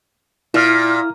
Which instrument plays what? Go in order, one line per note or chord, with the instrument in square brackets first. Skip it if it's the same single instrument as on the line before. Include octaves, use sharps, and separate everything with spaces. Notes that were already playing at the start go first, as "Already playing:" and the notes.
[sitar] A#2 [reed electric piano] E4 F6